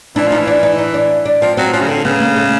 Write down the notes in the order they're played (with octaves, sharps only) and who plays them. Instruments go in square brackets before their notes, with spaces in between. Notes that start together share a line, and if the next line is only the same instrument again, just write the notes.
[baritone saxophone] E3 [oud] D4
[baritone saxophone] F3 [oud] D#4
[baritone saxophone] E3
[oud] D4
D#4
D#4
D4
D4
[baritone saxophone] F3 [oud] C4
[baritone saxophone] F#3 [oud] C4
[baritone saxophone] F3 [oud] C#4
[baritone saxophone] C#3
[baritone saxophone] D3 [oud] C4
[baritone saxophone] C#3 [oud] B3
[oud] A#3
A3